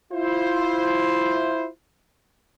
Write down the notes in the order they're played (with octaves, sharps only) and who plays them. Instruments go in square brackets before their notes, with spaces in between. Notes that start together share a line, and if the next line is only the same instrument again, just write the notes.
[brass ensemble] E4 F4 C5